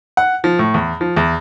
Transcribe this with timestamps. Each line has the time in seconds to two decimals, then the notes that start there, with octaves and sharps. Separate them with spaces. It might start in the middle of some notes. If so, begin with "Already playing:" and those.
0.17 F#5
0.44 F3
0.59 A2
0.74 E2
1.01 F3
1.16 E2